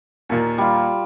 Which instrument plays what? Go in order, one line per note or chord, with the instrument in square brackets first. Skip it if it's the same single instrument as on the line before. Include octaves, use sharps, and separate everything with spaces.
[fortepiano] D#2 A#2
[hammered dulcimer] G3 F4